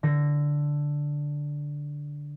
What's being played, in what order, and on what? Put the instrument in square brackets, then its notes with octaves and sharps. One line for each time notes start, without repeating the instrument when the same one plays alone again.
[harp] D3 A#6